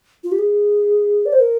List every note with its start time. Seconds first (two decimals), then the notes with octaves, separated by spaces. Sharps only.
0.24 F4
0.32 G4
0.38 G#4
1.26 D5
1.33 C5
1.40 A#4